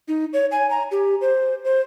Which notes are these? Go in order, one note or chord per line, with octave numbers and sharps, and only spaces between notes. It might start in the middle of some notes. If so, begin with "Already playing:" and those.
D#4
C#5
G#5
A#5
G4
C5
C5